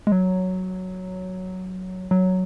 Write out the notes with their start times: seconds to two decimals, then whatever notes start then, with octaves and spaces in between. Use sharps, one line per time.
0.07 G#3
0.12 F#3
2.11 F#3